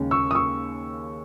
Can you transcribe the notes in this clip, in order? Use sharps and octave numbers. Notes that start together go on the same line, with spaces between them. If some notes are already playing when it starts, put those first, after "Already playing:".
Already playing: D#2 C#3 G#3 C#4
C#6 E6
D#6
C#6 E6